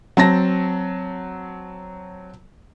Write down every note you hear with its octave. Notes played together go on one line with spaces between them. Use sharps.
F#3 C4 A5 A#6